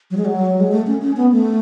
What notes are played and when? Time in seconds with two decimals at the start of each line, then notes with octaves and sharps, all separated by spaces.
0.11 F#3
0.17 G#3
0.25 F#3
0.60 G#3
0.72 A3
0.87 C#4
1.02 C#4
1.16 B3
1.32 A3